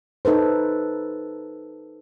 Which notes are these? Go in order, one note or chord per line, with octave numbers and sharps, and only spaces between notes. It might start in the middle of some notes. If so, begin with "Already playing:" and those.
D#4 A4 B4 C5